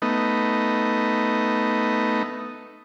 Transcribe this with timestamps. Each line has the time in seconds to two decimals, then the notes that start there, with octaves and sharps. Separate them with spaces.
0.02 A3 B3 D#4